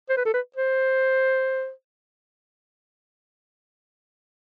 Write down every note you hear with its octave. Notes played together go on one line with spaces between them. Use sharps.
C5
B4
A4
B4
C5